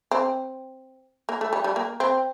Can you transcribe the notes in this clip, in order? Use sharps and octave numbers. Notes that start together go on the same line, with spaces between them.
C4
A#3
A3
G3
G3
A#3
C4